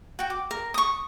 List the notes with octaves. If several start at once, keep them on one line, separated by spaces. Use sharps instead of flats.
F#4 G5
D6
A#4
C#6 D#6